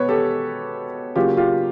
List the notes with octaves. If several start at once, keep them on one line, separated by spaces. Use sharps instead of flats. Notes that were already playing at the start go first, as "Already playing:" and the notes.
Already playing: B2 G#3 B3 B4 C#5
G4 A4
C#3 F#3 A#3 F4 G4
F4 G4